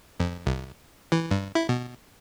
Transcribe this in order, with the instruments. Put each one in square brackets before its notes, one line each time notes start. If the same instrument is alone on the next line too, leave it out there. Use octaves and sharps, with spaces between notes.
[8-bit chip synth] F2
C2
E3
G2
E4
B2